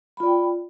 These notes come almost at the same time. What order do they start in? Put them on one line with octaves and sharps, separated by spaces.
B5 F4 D5 G5